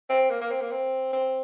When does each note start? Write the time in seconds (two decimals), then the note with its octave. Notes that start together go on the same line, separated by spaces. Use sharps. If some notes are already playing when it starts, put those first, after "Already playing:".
0.10 C4
0.30 A#3
0.41 A#3
0.51 C4
0.61 A#3
0.71 C4
1.12 C4